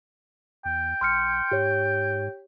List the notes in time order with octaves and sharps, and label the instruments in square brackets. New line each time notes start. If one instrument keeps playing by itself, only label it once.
[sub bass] E2 [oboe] G5
[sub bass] B1 [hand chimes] C6 F6 C#7
[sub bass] G#2 [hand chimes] G4 C#5